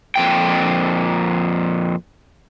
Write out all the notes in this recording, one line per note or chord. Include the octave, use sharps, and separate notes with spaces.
F2 A#2 G5